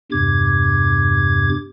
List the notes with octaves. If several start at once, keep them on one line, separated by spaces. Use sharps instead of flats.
E2 G2 C3 D6 G#6